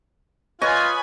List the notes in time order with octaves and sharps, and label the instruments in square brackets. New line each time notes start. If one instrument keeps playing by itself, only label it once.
[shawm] F4 [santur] B4 C#5 [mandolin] D#5 [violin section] G#5 B5